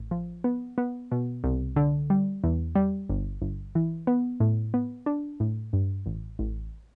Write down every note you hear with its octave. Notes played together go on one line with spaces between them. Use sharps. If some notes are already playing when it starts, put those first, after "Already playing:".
Already playing: A1
F3
B3
B3
B2
C2
D3
G3
E2
G3
G1
G1
E3
B3
A2
B3
D4
A2
G2
A1
A1